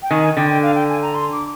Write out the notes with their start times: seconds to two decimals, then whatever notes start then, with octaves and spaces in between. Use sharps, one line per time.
0.02 G5
0.11 D#3 G#5
0.23 G#5
0.37 D3 G5
0.49 G5
0.62 F5
0.75 G5
0.89 G#5
1.02 A#5
1.15 C6
1.32 D6